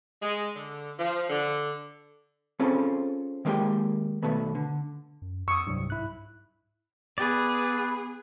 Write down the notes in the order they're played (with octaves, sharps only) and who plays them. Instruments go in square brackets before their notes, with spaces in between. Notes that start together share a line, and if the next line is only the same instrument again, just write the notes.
[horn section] G#3
D3
F3
D3
[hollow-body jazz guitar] C4 C#4 F4 G#4 A4
D#3 G#3 A#3 D4 G4 G5
B2 D#3 A3 B3
D3
[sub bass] F#2
[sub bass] F2 [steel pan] C#6 D#6 [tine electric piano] E6
[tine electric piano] C2 G2 [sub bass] F#3
[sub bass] G#2 [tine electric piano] E4 F#6
[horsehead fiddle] B3 G#4 [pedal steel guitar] B4 D5